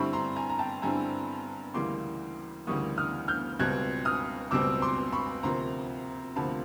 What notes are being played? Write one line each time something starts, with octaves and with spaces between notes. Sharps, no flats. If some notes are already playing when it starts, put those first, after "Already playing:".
Already playing: G2 D3 G3 C4 E4 B5 C#6
A#5 C6
G#5 A#5
A#5
G5 A5
G2 D3 G3 C4 E4 G#5 A#5
D2 C#3 E3 G3 A#3 C6 D6
D2 C#3 E3 G3 A#3 C#6 D#6
D#6 F6
F6 G6
C#2 B2 G3 C4 F#6 G#6
D#6 F6
C#2 B2 G3 C4 D6 E6
C6 D6
B5 C#6
D2 C3 F3 A#3 A#5 C6
D2 C3 F3 A#3 A5 B5